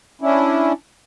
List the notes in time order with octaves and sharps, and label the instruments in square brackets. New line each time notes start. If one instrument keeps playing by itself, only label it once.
[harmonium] C#4 D4 E4